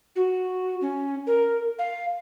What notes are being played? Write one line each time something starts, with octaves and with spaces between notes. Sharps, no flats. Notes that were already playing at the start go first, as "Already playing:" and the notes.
F#4
C#4
A#4
F5